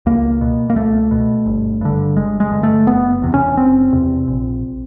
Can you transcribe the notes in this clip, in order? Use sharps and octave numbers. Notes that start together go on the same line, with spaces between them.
C#2 A#3
B2
A#3
C#2 A3
B2
G1
G2 D3
G1 G#3
G#3
G2 D3
A3
F#1 B3
E2 C3
C#4
F#1 C4
E2 C3
A#1